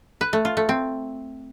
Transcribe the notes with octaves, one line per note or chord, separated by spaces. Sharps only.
B4
A3
F4
A3
C4